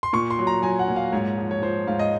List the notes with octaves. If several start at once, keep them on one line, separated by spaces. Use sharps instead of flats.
C6
A#2 C#6
C6
F#3
A#5
F#3 G#5
F#5
A#2
F5
G#2 C#5
F3
C#5
F3 C5
G#2 F5
D#5